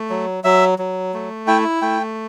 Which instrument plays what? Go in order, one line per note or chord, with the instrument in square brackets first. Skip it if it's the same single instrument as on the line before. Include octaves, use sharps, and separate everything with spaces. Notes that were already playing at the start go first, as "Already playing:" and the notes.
Already playing: [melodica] A3
F#3
F#3 E5
F#3
A3
E4 G5
A3 G5